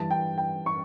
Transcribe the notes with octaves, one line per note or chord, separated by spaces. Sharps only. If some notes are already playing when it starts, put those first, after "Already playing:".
Already playing: G2 E3 A5
G5
G5
C#6